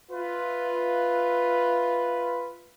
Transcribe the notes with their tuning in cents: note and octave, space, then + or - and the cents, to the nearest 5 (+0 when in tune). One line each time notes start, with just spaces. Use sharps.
F4 +0 B4 +0 E5 +0